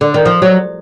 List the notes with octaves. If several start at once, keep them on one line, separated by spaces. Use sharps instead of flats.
D3
D#3
F3
F#3